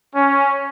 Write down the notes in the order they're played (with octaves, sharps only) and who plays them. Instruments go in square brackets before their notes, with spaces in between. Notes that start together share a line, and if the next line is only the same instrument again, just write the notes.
[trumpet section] C#4